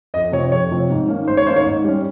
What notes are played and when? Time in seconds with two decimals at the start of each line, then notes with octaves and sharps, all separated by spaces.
0.14 F2 D#5
0.32 C3 F3 C4 C#5
0.51 F2 C#5
0.71 C3 F3 C4
0.90 G#2
1.08 D#3 A#3 C#4
1.28 G#2 C5
1.37 C#5
1.47 D#3 A#3 C#4 C5
1.56 C#5
1.65 G#2
1.84 G3 C#4